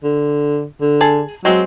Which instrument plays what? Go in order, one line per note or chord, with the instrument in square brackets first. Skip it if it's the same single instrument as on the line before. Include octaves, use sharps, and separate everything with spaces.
[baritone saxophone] D3
D3
[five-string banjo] G#4 A5
[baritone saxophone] F#3 [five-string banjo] G#3 C4